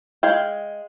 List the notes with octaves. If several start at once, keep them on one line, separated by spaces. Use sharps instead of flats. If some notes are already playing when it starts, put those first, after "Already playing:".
G#3 G#4 F5 G5